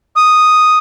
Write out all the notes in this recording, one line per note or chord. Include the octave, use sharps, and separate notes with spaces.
D#6